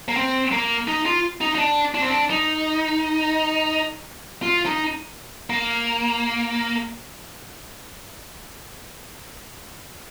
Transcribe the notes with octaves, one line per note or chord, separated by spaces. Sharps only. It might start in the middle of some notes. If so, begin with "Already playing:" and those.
A#3
C4
A#3
D#4
F4
D#4
D#4
D4
D4
C4
D4
D#4
F4
D#4
A#3